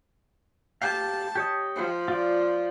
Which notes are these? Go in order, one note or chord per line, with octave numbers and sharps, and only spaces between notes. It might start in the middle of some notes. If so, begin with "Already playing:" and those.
G4 F5 A5
G4 C#5 D#5
F3
F4 D5